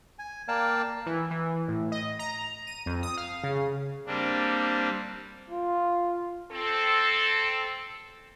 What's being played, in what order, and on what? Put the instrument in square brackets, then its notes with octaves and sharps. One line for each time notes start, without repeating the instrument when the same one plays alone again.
[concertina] G#5
A#3 A#4 D5 F5 G5 A5
[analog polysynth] E3
E3
A2
D#5
A#5
D#7
F2
D#6
F5
C#3
[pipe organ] G3 A#3 C4 D4
[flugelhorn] F4
[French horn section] C4 A4